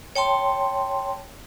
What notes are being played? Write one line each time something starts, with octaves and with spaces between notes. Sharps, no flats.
C#5 G5 A5 C6